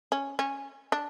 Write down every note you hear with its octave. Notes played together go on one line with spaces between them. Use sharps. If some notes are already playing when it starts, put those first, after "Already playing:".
C#4
C#4
D4